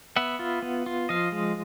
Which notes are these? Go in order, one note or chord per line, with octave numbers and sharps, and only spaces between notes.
B3 E5 F#5
F4
B3
F4
F3 D#5 F5
G#3